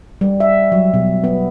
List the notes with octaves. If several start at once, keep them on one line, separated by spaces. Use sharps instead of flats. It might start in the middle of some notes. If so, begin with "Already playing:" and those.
G3
E5
F#3
B2
B3